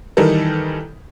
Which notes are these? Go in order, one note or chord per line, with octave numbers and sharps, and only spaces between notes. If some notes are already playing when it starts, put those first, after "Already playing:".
D#3 E3 G3 D#4 A4 A#4